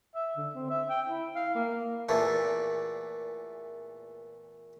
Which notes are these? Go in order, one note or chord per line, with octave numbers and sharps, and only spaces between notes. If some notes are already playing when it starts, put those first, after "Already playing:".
E5
D3
C4
E5
G5
E4
F5
A#3
E2 A#2 A3